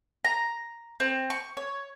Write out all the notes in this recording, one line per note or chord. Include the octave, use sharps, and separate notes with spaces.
A#5
C4
C#6
C#5